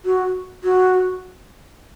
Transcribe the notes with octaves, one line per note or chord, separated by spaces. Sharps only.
F#4
F#4